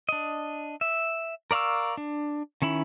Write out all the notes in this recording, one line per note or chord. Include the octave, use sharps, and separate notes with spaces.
D4 D#5
E5
A#4 D5 F5 C#6 E6
D4
D#3 C#4 E4 B5